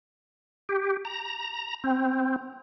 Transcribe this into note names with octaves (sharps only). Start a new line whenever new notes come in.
G4
A#5
C4